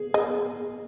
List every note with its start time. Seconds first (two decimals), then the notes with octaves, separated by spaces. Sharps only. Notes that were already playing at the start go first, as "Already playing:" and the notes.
Already playing: G#4
0.14 G#4 D#5